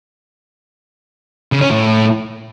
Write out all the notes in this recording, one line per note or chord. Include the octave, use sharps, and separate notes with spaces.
C#3
C#4
A2